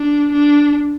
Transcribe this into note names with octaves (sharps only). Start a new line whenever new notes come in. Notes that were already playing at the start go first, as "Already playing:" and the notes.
Already playing: D4
D4